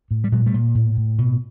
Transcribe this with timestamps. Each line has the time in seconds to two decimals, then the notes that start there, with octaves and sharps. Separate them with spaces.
0.11 A2
0.24 G3
0.32 A#2 F#3 G#3
0.46 G3 A3
0.54 A#2
0.75 A2
0.97 A2
1.18 B2